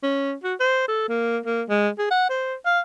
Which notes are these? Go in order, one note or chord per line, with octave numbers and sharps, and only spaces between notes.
C#4
F#4
C5
A4
A#3
A#3
G#3
G#4
F#5
C5
F5